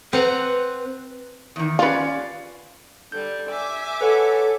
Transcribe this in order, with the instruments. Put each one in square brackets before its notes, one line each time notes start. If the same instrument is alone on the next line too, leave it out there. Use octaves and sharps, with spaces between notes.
[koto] C4 F#5 A#5 [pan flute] B4
[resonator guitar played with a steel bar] E2 D#3
[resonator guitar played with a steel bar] C#4 D5 F5 [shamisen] F4 B4
[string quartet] D3 G3 [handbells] G6
[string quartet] E5 G#5 D6
[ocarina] A4 [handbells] B4 C#5 F#5